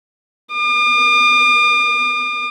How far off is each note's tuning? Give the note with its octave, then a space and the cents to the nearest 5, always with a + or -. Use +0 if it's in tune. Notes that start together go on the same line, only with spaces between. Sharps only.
D6 +45